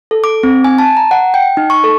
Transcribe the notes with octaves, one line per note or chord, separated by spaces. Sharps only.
A4
D6
C4
G#5
A5
A#5
F#5
G5
D#4
C#6
A4